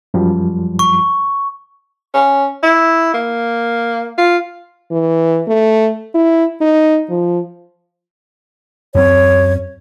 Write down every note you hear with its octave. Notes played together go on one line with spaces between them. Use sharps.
F#2 F3 G3
C#6
C#4
E4
A#3
F4
E3
A3
E4
D#4
F3
F#2 C4 C#5